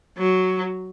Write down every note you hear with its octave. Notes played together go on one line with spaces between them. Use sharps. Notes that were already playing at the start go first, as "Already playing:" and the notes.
F#3